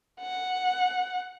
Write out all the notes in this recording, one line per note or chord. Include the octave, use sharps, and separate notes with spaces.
F#5